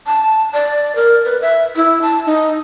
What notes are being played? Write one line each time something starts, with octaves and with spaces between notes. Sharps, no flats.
A5
D5
A#4
B4
E5
E4
A5
D#4